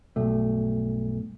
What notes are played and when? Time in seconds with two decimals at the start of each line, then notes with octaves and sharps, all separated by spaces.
0.16 B1 G2 A3